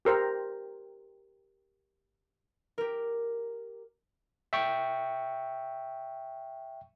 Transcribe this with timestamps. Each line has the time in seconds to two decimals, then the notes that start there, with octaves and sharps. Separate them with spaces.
0.05 G4 A#4 C5
2.78 G4 A#4
4.53 E5 G5 C#6